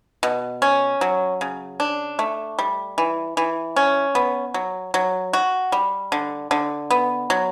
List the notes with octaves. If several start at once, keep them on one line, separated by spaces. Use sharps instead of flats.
B2
C#4
F#3
C#3
D4
A3
G3
E3
E3
C#4
B3
F#3
F#3
F#4
G3
D3
D3
B3
F#3